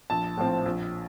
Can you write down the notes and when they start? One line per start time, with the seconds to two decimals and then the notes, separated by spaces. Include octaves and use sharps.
0.10 A#1 A5
0.37 A2 F3 C4
0.66 A#1